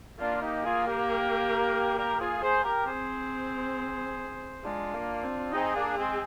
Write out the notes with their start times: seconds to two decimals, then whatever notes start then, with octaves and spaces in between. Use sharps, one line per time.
0.20 A#3 D4 F4
0.36 F4
0.42 D#4 G4
0.64 F4 G#4
0.86 G4 A#4
1.98 G4 A#4
2.20 F4 G#4
2.42 G#4 C5
2.64 G4 A#4
2.86 C4 G#4 C5
4.64 G#3 D4 F4
4.94 A#3
5.23 C4
5.53 C4 D#4 G#4
5.75 A#3 D4
5.97 G#3 C4